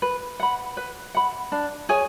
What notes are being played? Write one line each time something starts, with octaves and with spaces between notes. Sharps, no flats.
B4
F#5 B5
B4
F#5 B5
D4
G#4 C#5 G#5